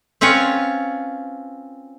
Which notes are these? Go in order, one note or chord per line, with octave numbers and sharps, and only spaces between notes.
C4 C#4 F4 B4 C#5